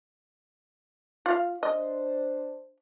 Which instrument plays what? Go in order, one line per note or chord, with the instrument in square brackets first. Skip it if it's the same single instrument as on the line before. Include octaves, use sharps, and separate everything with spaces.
[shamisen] F4 F5
[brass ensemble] D4 C5 [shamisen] D#5